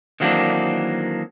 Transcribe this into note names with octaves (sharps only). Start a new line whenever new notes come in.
D#3 E3 F#3 A#3 C4 D4